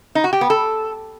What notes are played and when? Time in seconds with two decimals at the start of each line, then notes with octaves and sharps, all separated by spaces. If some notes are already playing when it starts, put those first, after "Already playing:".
0.15 D#4
0.24 F#4
0.33 G4
0.41 B3
0.50 A4